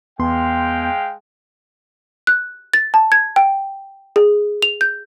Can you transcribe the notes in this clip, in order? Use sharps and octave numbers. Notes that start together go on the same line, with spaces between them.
E2 G#3 B3 F5 G5 C6
F#6
A6
A5
G#6
G5
G#4
F7
G6